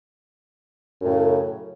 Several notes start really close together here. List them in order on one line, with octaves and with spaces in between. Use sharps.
F#2 A2 C#3